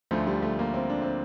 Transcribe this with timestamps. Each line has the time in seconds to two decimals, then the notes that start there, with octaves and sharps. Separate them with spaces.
0.11 D2 D3 F3 A3
0.27 G3
0.42 A3
0.59 A#3
0.74 C4
0.90 D4
1.02 C4